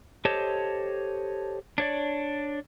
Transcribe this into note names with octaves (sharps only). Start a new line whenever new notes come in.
G4 A4 C5 C#5 D#5 A5
D4 C#5 D5